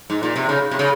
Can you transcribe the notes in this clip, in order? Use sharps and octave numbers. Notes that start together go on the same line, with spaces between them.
G#2
A#2
C3
C#3
C3
C#3